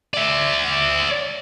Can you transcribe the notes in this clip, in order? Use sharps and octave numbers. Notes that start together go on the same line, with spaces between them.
D5 E5